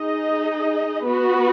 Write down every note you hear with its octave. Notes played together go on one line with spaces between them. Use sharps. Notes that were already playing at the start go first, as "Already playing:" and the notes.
Already playing: D#4 G#4 D#5
B3 F#4 B4